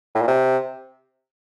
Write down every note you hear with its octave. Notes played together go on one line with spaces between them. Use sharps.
A2
A#2
C3